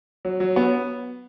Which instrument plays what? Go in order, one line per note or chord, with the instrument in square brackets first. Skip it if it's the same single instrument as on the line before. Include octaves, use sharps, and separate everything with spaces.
[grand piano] F#3
F#3
B3